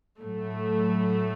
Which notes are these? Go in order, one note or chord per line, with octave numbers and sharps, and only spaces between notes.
A2 F#3 A3